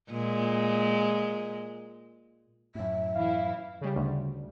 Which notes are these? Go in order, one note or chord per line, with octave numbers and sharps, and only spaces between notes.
A#2 G#3
F#2 A2 E5
E3 E4 F5
C#3 G3
D2